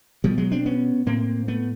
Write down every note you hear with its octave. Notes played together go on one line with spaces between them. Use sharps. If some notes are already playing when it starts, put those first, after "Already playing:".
B2 F3 G3
F#3 G#3
C4 D4
B3 C#4
A2 A#3 C4
A3 B3